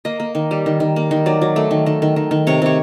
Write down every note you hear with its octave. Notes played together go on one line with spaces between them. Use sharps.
A#3 D#5
A#3
D#3
G3
D#3
D#3
A#3
D#3
F#3 D5
F#3
A3
D#3
D#3
D#3
D#3
D#3
C3 C#5
C3 C#5